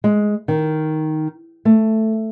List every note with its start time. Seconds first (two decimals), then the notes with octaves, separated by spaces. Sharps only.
0.04 G#3
0.48 D#3
1.65 A3